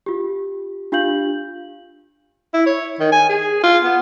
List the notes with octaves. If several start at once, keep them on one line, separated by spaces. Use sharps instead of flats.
F4 G4
D4 F4 G4 F5 G6 F#7
E4
C#5
D#3
G#5
G#4
F4
B3